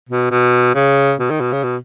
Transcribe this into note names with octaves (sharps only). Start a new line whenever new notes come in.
B2
B2
C#3
B2
D#3
B2
C#3
B2